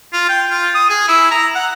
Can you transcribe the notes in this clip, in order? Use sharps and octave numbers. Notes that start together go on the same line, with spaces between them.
F4
G5
F4
D#6
G#4
E4
A#5
F#5